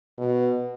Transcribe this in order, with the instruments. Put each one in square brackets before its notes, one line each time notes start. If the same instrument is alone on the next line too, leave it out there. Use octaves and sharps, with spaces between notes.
[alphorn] B2